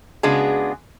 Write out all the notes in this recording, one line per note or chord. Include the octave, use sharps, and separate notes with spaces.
C#3 G#3 B3 D4 F#4 G#4